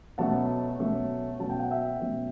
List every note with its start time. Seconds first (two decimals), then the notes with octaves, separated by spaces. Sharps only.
0.18 B2 F#3 A3 C#4 F#5 A5
0.79 B2 F#3 A3 C#4
1.39 B2 F#3 A3 C#4 A5
1.50 G5
1.60 F#5
1.71 E5 G5
1.99 B2 F#3 A3 C#4